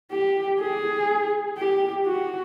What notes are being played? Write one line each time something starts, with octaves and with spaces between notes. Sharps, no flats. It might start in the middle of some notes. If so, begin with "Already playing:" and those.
G4
G#4
G4
F#4